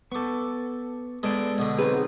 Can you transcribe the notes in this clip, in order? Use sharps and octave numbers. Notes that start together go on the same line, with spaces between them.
B3 A4 C#6 D6
G#3 B3 A4 D5
B2 D3
F#3 C4 D#4 G#4 B4